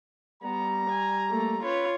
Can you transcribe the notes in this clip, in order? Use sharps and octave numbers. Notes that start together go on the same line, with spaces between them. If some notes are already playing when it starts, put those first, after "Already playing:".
G3 B3 A#5
G#5
A3 A#3
C#4 F4 B4 C#5